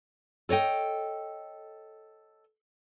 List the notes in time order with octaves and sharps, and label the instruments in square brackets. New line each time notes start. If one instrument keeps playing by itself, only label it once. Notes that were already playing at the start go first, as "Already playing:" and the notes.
[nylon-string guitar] A4 C#5 D#5 G5